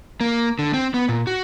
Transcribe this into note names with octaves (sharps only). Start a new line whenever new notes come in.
A#3
D3
C4
B3
A#2
F#4